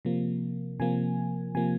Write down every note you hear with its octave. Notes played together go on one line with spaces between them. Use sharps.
C3 F3 A#3
C3 F3 A#3 G#5
C3 F3 A#3 G#5